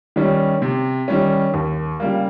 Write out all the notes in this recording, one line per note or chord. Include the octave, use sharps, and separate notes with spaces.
D#3 G3 C#4
C3
D#3 G3 C#4
D#2
C#3 G3 A#3